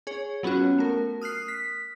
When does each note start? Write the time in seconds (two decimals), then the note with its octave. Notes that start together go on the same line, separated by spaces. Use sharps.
0.07 G#4 C#5
0.43 F#3 B3 C#4 F4 F#4
0.78 A3 A#4
1.22 D#6 F6 F#6 C7
1.48 B6